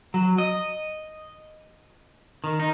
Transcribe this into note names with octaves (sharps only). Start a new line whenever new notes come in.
F#3
D#5
D#3
D#4